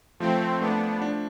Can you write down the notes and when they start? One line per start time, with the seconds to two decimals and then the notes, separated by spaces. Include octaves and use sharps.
0.20 F3 A3 C4
0.61 A3 B3 D4
1.02 D4